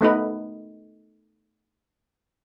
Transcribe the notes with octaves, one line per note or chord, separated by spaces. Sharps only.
A3 B3 D#4 B4